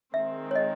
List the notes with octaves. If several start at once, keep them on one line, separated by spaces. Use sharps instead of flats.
D#3 G#3 C4 E5
C#5
D#5